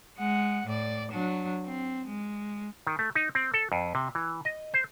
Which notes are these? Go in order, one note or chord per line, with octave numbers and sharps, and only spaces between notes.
G#3 F#5
A2 D5
F#3 D4
C4
G#3
D#3
A3
D#4
C4
A4
F2
C3
E3
D#5
C5